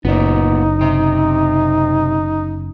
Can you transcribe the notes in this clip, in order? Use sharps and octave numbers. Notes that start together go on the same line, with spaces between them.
F#1 A#2 B3 D#4
C3 C4